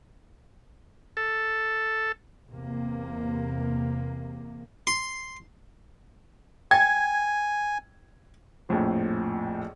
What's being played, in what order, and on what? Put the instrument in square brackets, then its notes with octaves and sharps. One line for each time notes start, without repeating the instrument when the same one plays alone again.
[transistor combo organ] A4
[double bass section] E2 C3 A#3
[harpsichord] C6
[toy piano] G5 [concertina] G#5 [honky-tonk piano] G#6
[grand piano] A#1 F2 A2 F3